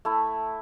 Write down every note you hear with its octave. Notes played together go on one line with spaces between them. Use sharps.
A3 E4